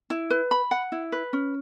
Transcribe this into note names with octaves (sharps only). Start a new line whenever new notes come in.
E4
B4
B5
F#5
E4
B4
C#4